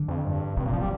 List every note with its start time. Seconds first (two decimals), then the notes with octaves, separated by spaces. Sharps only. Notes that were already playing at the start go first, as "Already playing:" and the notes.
Already playing: D3
0.08 F2
0.25 G2
0.57 G2 C3
0.66 A#2
0.73 F3
0.81 G3